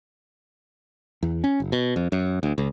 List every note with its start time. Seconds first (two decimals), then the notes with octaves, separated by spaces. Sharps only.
1.23 E2
1.44 C#4
1.60 F#1
1.72 B2
1.96 F2
2.12 F#2
2.43 D2
2.58 C#2